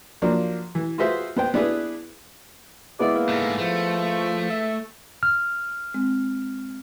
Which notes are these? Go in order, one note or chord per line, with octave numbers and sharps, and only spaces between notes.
F3 F#3 A#3 D4
E3
F4 F#4 G#4 B4 C5 E5
B3 C5 G5
B3 D4 E4 G#4 B4
G#3 B3 E4 D5
E3 A#3
G#2 A3
F3 A3
E5
F6
G#3 C4